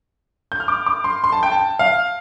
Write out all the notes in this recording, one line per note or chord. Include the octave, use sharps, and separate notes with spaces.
G6
F6
D6
D6
C6
C6
A5
G5
A5
F5